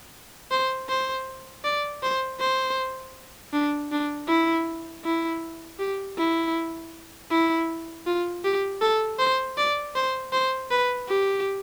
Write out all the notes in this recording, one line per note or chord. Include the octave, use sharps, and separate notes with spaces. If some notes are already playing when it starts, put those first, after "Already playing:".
C5
C5
D5
C5
C5
D4
D4
E4
E4
G4
E4
E4
F4
G4
A4
C5
D5
C5
C5
B4
G4